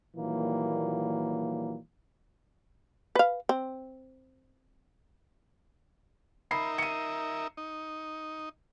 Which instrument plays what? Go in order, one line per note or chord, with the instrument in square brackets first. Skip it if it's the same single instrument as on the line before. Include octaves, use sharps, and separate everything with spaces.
[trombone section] A#2 D#3 E3 F#3 G3 A#3
[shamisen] B4 F5
C4
[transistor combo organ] D#4 A#4 E5 [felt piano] B5 C7
[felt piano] C#7 D#7
[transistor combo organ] D#4